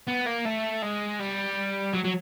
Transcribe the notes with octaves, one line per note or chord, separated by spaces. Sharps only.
B3
A#3
A3
G#3
G3
F#3
F#3